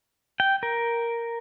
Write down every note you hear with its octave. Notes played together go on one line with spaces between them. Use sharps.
G5
A#4